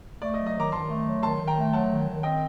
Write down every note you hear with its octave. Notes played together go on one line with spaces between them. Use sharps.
A3 D5
D#5
F#3
D#5
D#3 A#5 D6
D#3 A5 C6
A3
F#3
D#3 A5 C6
D#3
G5 A#5
A3
F#3 F#5 A5
D#3
D#3
C4 D#5 G5